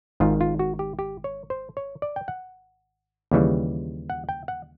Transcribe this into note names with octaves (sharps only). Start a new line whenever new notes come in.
G#1 G#2 D#3 F4
F4
F#4
G4
G4
C#5
C5
C#5
D5
G5
F#5
D#2 C#3 E3 G3
F#5
G5
F#5